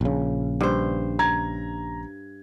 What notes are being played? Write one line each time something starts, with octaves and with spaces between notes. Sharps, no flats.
A#1 C#3
G2 C5
A#5 G#6